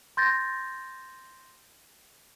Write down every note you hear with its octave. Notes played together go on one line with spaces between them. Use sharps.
C6 G6 A6 A#6